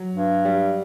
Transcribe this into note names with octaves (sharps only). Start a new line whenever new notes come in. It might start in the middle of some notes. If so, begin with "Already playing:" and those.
Already playing: F#3
G2
G3